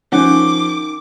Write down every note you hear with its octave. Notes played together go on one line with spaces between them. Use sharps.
D#3 F3 C#4 F#5 D6